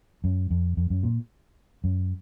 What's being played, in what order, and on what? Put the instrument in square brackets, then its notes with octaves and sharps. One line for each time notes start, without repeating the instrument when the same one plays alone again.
[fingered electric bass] F#2
F2
F2
F#2
A#2
F#2